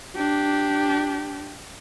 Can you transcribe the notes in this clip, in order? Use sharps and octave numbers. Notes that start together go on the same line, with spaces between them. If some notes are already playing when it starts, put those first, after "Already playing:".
D4 G4